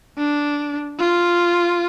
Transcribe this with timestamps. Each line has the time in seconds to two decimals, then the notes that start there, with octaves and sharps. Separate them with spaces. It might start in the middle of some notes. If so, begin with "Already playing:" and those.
0.18 D4
0.99 F4